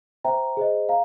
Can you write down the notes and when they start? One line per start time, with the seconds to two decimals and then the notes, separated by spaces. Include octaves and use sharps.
0.25 C5 E5 G5 A#5
0.57 G#4 C5 D#5
0.89 F5 A#5